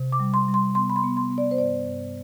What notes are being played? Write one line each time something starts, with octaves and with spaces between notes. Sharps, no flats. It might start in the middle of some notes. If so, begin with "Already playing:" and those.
Already playing: C3
D6
G3
C6
G3
C6
B3 C6
B5
C6
B3
C6
B3
D5
C5
G2 D5
G2